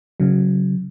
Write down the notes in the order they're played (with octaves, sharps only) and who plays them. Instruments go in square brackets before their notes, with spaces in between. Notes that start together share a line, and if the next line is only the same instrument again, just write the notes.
[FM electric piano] C#3 F#3